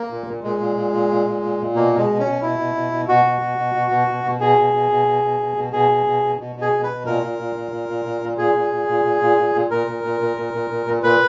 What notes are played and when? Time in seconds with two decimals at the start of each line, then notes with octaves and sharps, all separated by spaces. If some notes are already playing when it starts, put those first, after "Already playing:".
Already playing: A#3
0.10 A#2
0.27 A#2
0.43 A#2 G#3
0.60 A#2
0.76 A#2
0.93 A#2
1.10 A#2
1.26 A#2
1.43 A#2
1.59 A#2
1.76 B2 A#3
1.93 B2
1.98 G#3
2.09 B2
2.20 C#4
2.25 B2
2.42 B2 E4
2.59 B2
2.75 B2
2.92 B2
3.08 B2 F#4
3.25 B2
3.41 B2
3.58 B2
3.75 B2
3.91 B2
4.08 B2
4.24 B2
4.41 B2 G#4
4.57 B2
4.74 B2
4.91 B2
5.07 B2
5.24 B2
5.40 B2
5.57 B2
5.73 B2 G#4
5.90 B2
6.06 B2
6.23 B2
6.39 B2
6.56 B2
6.62 G#4
6.73 B2
6.84 B4
6.89 B2
7.06 A#2 A#4
7.22 A#2
7.39 A#2
7.56 A#2
7.72 A#2
7.89 A#2
8.05 A#2
8.22 A#2
8.38 A#2 G#4
8.54 A#2
8.72 A#2
8.88 A#2
9.04 A#2
9.21 A#2
9.37 A#2
9.55 A#2
9.71 A#2 A#4
9.87 A#2
10.04 A#2
10.20 A#2
10.37 A#2
10.53 A#2
10.70 A#2
10.86 A#2
11.03 A#2 B4